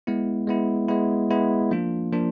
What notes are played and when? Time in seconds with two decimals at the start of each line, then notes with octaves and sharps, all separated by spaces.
0.07 G#3 B3 E4
0.47 G#3 B3 E4
0.89 G#3 B3 E4
1.30 G#3 B3 E4
1.71 F3 A#3 D4 F4
2.12 F3 A#3 D4 F4